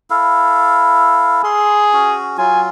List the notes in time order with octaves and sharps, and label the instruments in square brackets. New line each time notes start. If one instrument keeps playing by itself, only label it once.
[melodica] E4 A4 F5
[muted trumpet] G#4 [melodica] C6
[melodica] C#4 F#4
[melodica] F#3 F4 [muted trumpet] G#5